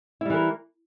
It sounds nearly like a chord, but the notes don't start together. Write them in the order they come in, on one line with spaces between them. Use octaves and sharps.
E4 G3 E3 A#4